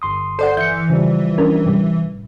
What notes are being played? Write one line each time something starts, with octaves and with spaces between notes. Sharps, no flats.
G1 C6 D#6
A4 C5 D5 F#5
E3 G6 C#7
C#3 F3 G3
C#4 D4 A#4
A2 C3 G3